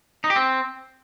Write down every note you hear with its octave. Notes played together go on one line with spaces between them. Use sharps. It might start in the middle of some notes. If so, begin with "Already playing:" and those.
D#4
G4
C4